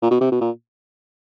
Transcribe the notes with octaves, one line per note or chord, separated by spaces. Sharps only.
A#2
B2
C3
B2
A#2